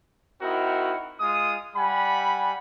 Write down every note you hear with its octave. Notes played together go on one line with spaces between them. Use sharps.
C4 D#4 E4 F#4 A#4
G#3 F4 D#6
G3 F#5 G#5 B5